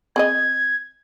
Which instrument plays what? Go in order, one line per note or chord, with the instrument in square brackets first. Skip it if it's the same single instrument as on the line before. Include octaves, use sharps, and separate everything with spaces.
[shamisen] C4 G#4 D#5 [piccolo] G#6